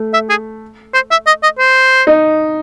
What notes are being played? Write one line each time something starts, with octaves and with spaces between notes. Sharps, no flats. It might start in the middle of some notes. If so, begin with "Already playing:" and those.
Already playing: A3
E5
G#4
C5
E5
D#5
D#5
C5
D#4